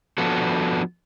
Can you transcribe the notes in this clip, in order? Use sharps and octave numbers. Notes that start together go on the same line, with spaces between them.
F3 B3 D4 F#4 A4